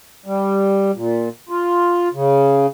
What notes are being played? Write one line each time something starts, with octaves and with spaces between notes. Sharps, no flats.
G3
A#2
F4
C#3